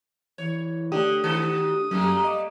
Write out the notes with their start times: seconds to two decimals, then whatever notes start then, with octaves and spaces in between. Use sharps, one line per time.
0.38 E3 C#5
0.92 D3 A3 D4 G4 D#6
1.24 D#3 F#4 A4
1.91 F#2 G3 A3 A#3
2.24 D#5 D6